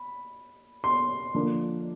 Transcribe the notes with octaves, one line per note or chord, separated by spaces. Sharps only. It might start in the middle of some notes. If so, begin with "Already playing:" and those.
Already playing: B5
C6
D3 F3 A#3 D4